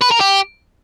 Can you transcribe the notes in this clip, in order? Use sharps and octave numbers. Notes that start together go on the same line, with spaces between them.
B4
A#4
G4